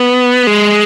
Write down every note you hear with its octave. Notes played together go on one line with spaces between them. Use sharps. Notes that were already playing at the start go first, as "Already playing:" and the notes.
Already playing: B3
G#3